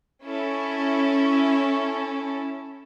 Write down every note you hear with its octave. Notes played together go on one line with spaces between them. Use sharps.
C#4 E4 A4